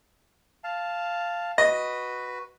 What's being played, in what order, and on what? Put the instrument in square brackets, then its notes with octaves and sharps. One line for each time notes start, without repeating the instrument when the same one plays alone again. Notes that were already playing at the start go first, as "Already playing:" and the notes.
[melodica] F5 A5
[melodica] F#4 B4 [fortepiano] D#5